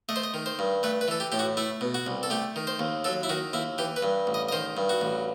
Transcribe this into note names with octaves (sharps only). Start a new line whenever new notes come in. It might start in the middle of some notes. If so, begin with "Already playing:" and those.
A3 D#5
C5
D#5
D#3
C5
G2
A3 B4
B4
E3 A4
G4
A2 G4
F#4
A3 E4
B2
F#4
C2
A4
A3 G4
D#3
C5
D#2
F#3 A4
E4
D#3 F#4
D#2 E4
E3 G4
B4
G2
A1
D#5
D#5
D#3 C5
G2
F#4
A1